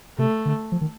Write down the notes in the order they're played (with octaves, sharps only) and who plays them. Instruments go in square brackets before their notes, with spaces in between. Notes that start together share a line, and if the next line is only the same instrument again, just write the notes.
[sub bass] C3 [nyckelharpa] A3
[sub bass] D3
F3
D#3